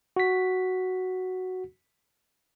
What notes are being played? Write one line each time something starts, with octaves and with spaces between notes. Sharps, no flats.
F#4 B6